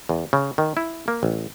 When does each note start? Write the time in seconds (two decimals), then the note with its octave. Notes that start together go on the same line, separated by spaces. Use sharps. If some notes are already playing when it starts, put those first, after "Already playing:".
0.09 E2
0.33 C#3
0.58 D#3
0.77 E4
1.08 A#3
1.23 A1